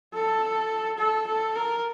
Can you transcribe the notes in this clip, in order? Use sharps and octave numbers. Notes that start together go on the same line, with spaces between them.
A4
A4
A4
A#4